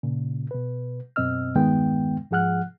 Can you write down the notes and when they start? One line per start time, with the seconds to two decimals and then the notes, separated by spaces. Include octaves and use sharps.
0.03 A#2 C#3
0.51 B2 B4
1.16 F#2 B2 C4 D#5 E6 F6
1.55 E2 G2 D#3 G#3 B3 G5
2.31 G#2 F3 G#4 F#5 F6 F#6